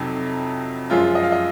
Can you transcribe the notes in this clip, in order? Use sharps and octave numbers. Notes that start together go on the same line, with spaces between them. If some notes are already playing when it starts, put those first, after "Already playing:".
Already playing: F2 C3 F#3 D#4
F#2 F3 G#3 F4
D#5
F5
D#5